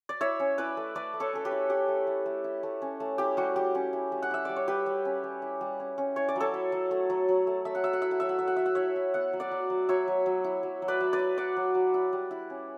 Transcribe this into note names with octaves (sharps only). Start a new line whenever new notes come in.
D5
E4 C#5 E5
C#4
E4 B4 D5
A3
A3 B4 D5
A3
A4 C#5
C#4 A4
G4 B4
E4
A3 G4
A3
A3
A3
E4
A3
C#4
A3
E4 G4
G3 F#4
G3 G4
C#4
E4
G3
F#5
E4 E5
G3 D5
C#5
G3 G4 B4
G3
C#4
G3
E4
G3
C#4
C#4
E4 C#5
D5
F#3 A4 C#5
E4
F#3
A3
F#3
F#3
A3
A3 E5
F#5
F#3 E5
F#5
E4 E5
F#5
F#3 E5
F#5
F#3 E5
F#5
A3 E5
F#5
E4 C#5 E5
E4
B3 F#5
F#3
D5 F#5
F#3
F#3
F#3 C#5 E5
F#3
F#3
E4
F#3
F#3
B4 D5
F#3
B4 D5
E4
F#3 D5 F#5
F#3
F#3
E4
G3
E4
C#4